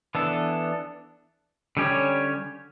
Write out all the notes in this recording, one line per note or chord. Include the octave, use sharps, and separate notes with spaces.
E3 B3 D4 A4
D3 G3 C#4 G4 C#5